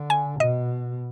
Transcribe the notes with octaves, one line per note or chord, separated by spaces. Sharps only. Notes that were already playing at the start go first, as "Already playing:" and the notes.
Already playing: D3
G#5
B2 D#5